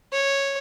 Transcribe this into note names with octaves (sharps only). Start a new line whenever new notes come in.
C#5